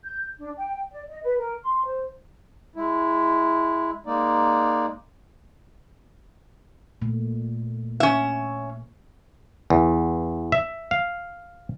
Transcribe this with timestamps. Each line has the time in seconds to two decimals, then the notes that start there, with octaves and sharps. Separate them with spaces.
0.04 G6
0.38 D4
0.57 G5
0.91 D5
1.08 D#5
1.23 B4
1.39 A#4
1.61 C6
1.84 C5
2.76 G#3 E4
4.06 G#3 A#3 D#4 D5
7.02 A#2 A3
8.00 C#4 E5
9.70 E2
10.52 E5
10.91 F5